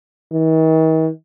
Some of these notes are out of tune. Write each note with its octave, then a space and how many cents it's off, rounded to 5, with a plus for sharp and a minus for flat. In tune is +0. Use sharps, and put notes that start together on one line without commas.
D#3 +45